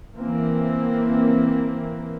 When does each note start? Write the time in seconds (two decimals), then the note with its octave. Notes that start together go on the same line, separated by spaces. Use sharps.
0.15 E3 A#3 C4